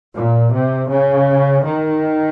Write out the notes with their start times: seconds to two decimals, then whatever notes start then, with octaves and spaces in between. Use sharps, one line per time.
0.14 A#2
0.51 C3
0.89 C#3
1.63 D#3